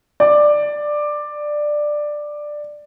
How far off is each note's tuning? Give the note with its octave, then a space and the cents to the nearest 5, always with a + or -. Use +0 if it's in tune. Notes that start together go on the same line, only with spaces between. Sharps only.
D5 +10